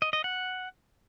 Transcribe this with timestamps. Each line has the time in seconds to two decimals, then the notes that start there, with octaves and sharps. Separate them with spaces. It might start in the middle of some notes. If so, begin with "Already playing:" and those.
0.02 D#5
0.13 D#5
0.24 F#5